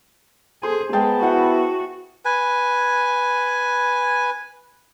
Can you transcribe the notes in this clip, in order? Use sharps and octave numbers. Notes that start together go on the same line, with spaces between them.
G#4 A4 C5
G#3 B3 G#4 G5 A5
E4 F#4 F#5
B4 G#5